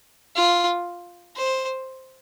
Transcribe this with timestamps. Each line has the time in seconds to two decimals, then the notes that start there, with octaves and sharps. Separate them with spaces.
0.36 F4
1.36 C5